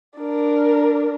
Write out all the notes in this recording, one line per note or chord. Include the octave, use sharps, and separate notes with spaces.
D4 A#4